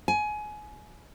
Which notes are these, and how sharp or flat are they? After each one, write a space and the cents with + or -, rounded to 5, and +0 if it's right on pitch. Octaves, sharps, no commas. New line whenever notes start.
G#5 +25